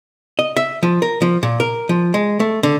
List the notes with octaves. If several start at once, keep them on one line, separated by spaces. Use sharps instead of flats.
D#5
E5
F3
A#4
F3
A#2
A#4
F3
G#3
A3
D3